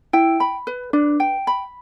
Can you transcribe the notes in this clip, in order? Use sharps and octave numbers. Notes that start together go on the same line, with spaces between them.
E4 G5
B5
B4
D4 B4
G5
B5